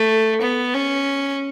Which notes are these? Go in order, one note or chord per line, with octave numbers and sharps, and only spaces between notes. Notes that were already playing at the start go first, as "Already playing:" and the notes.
Already playing: A3
B3
C#4